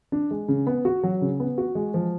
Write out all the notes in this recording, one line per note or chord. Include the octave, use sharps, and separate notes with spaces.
D4
G#3
C#3
B3
F#4
F#3
C#3
B3
F#4
G#3
F3